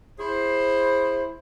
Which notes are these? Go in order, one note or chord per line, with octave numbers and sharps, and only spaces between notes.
E4 G#4 C5